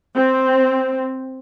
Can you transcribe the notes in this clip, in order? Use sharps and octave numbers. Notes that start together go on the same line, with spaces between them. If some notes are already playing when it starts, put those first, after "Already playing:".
C4